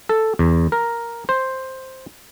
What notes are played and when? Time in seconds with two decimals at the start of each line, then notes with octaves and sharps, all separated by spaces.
0.09 A4
0.39 E2
0.72 A#4
1.29 C5